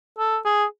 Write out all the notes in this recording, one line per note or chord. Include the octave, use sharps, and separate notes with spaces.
A4
G#4